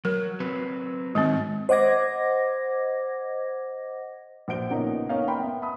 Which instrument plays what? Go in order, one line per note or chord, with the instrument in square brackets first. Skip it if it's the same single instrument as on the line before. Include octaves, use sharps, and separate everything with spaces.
[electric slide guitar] F#3 [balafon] A#4
[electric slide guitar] F#3 C4 B4
[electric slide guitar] G#2 D#3 F#3 [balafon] G#3 C4
[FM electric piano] C5 D#5 F#5 D6 G#6 A#6
[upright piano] A#1 F#4 C5 D7 G7
A#2 C#3 A#3 B3 C#4 D#4
A#3 B3 C#4 D#4 F5
A#4 G5 B5 C6
B3 E5
A5 B5 D#6